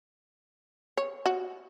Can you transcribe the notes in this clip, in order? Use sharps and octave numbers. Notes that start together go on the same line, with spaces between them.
C#5
F#4